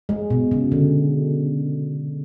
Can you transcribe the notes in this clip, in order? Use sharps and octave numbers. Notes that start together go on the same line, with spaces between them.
G#3
B2
C#3
D3